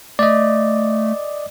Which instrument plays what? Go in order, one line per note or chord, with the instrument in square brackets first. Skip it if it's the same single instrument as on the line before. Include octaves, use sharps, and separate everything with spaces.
[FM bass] A3 [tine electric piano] D5 D#5